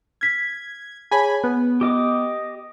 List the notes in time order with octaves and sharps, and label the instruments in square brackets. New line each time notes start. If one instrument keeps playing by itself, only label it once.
[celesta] F6 B6 [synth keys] G#6
[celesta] G#4 C#5 A5 [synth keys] G#5 B5
[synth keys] B3 [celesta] F#6
[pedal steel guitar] G4 D#5 D6